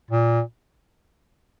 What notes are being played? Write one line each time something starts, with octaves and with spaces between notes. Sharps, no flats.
A#2